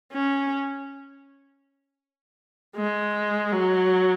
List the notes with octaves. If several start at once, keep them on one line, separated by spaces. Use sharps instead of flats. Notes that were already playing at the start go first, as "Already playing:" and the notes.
C#4
G#3
F#3